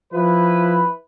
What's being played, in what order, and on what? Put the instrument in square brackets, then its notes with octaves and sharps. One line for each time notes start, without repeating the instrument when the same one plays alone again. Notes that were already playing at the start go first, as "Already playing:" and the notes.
[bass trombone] F3 [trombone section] E4 B4